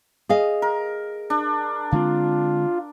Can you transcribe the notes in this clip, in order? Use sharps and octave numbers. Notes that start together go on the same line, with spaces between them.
G#4 D#5 F5
A#4
D4
D3 G#3 C4 F4